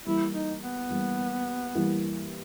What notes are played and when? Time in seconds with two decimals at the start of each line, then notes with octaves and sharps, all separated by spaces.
0.05 E3 G3 A#3 E4
0.34 D#4
0.62 B3
0.90 E3 G3 A#3
1.75 E3 G3 A#3